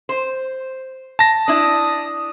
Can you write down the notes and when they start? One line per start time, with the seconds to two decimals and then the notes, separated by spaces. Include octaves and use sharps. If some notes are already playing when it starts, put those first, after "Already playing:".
0.09 C5
1.19 A5 A#6
1.48 D4 E4 D#6